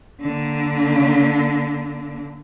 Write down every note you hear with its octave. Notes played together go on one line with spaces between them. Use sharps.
D3 A#3